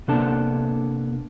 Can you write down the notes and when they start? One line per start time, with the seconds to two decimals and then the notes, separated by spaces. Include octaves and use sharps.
0.08 C3 A#3 B3 D4 A4 A5